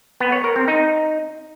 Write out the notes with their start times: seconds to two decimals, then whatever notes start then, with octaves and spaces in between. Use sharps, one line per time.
0.20 B3
0.32 C#5
0.44 A#4
0.56 C4
0.68 D#4